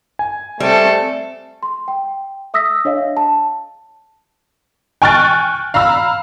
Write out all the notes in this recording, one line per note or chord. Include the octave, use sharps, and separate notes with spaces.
G#5
G3 A3 C4 A4
C6
G5
E5 D#6 E6 A#6 B6
D4 C#5 D#5 F5
A5
G5 G#5 C#6 F6 F#6 A6
F5 A#5 B5 E6